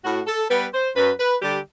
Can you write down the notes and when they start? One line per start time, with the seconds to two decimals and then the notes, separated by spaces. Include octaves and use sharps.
0.04 A2 F#4
0.27 A4
0.50 G3 B3 B4
0.73 C5
0.95 F#2 B4
1.19 B4
1.42 D3 G3 G4